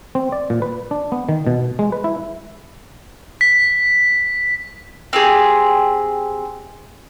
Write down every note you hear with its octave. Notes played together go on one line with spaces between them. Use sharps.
C4
D5
A#2
B4
D4
B3
D#3
B2
G#3
B4
E4
B6
C4 G4 G#4